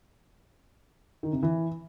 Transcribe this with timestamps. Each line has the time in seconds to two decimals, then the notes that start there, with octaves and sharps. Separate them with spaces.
1.23 D#3
1.33 C3
1.43 E3